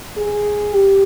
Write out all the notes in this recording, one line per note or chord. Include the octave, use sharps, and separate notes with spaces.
G#4
G4